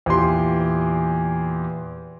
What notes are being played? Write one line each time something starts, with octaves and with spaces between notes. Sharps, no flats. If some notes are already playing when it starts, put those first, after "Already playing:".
E2 A#2 G4 C6